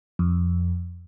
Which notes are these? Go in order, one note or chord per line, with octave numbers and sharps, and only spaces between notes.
F2